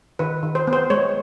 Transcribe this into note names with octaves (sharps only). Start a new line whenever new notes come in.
D#3 B4
D#3
C5
B3
C5
G#3 C#5